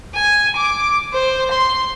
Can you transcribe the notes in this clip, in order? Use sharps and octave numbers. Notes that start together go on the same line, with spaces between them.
G#5
D6
C5
C6